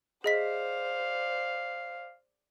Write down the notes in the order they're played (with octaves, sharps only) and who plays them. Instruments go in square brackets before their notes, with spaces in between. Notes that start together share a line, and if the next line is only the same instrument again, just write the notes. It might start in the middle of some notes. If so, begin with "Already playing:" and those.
[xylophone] G#4 D#5 B6 [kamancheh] C5 D5 [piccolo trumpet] F5